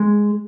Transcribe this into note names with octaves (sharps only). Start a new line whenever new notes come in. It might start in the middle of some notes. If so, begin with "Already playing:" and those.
Already playing: G#3